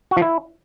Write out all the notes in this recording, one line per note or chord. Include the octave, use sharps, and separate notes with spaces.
F#4
F3
E4